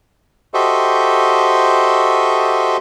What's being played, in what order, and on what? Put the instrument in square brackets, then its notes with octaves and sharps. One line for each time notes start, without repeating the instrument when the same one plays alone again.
[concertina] F#4 G4 A4 C5 D#5 E5